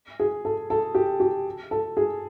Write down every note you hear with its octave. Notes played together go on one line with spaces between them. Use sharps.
G#4
A4
A4
G4
G4
A4
G#4